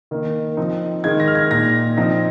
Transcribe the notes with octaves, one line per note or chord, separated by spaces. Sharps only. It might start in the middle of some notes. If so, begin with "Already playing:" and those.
D#3 A#3 D#4
F3 C4 D#4
D#3 G#3 D#4 G#6
A#6
F6
G#6
A#2 A#3 D#4 A#6
F3 C4 D#4 A#6